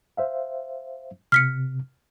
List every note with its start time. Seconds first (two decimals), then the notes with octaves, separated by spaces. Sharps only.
0.17 C5 E5 F5
1.32 C3 F6 B6 C#7